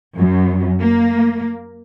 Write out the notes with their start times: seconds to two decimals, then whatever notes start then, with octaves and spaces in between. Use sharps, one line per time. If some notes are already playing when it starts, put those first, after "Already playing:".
0.17 F#2
0.80 A#3